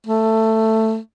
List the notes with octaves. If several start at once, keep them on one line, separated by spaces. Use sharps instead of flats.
A3